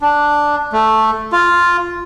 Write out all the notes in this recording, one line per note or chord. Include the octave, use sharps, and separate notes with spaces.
D4
A3
F4